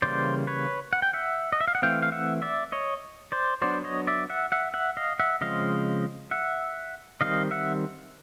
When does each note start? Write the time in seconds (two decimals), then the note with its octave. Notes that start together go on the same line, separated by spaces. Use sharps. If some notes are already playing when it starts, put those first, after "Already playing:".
0.02 C#3 E3 G3 A#3 C5 D5
0.47 B4 C#5
0.93 F#5
1.02 G5
1.13 E5 F#5
1.52 D#5
1.61 E5
1.68 F5
1.75 F#5
1.82 E3 A3 C4 F5 G5
2.02 F5
2.12 E5 F#5
2.42 D5 E5
2.72 C#5 D#5
3.32 C5 D5
3.62 F#3 B3 D4 C5 D5
3.84 C#5 D#5
4.07 D5 E5
4.30 E5 F#5
4.52 E5 F#5
4.74 E5 F#5
4.97 D#5 F5
5.20 E5 F#5
5.41 C#3 F3 G#3 C4 D#5 F5
6.31 E5 F#5
7.21 D#3 G3 C4 D#5 F5
7.51 E5 F#5